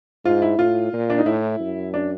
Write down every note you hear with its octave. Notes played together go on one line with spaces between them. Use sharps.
G#2 F4
E4
A2 F4
A#2
D4
D#4
A2 E4
F#2
D4